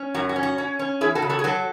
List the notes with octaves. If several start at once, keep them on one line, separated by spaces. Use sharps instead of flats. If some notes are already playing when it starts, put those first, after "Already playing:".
Already playing: C#4
F#2 F#4
F#4
C#4
F#4
C#4
C#4
E2 E4 G#4
F#4 A4
C#3
F#4 A4
G#4
F#3 F#4 A4